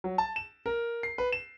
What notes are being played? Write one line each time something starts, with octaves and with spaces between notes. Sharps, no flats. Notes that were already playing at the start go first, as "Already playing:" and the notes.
F#3
A5
E7
A#4
C7
B4
E7